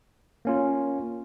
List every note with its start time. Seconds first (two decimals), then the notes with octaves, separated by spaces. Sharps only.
0.45 A#3 C#4 F4